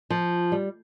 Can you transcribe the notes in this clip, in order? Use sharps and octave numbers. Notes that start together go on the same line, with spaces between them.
F3
G3